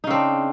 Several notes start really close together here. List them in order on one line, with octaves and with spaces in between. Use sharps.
D#4 C#3 C4 D4